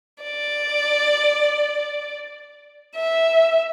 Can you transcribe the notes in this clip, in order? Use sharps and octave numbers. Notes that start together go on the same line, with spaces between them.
D5
E5